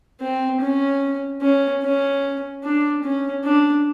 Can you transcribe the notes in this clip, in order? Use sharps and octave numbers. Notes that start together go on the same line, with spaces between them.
C4
C#4
C#4
C#4
D4
C#4
D4